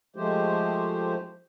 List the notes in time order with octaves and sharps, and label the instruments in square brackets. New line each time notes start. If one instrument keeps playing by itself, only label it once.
[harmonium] F3 G#3 A3 G4 C5